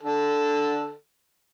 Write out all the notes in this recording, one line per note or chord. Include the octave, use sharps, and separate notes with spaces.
D3 A4